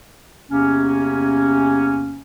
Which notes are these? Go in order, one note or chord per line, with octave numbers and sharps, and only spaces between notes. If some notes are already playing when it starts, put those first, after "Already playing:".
E2 C3 A#3 C#4